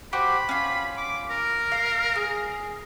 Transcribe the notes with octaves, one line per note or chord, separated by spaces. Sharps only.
F#4 G4 C5 B5
C#4 F4
D6
A#4
F5
G#4